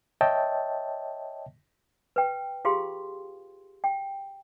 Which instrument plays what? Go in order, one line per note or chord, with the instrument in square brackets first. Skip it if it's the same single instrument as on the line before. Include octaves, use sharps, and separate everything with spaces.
[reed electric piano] C#5 D#5 E5 G5 A5
[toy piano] B4 G5
F4 G4 G#4 F5 C6
G5